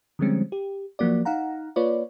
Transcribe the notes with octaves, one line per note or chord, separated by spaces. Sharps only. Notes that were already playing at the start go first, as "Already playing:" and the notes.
D3 F3 G3 G#3 C4 C#4
G4
F3 F#3 A#3 F#4 D5
D#4 F5 F#5 A#5
A#3 F4 B4 C#5 D5